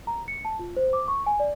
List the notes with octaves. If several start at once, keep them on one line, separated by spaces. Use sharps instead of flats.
A#5
C#7
A5
F4
C5
D6
C#6
G#5
D5